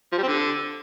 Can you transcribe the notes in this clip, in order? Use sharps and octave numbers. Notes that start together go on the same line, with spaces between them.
F3
G3
C4
D3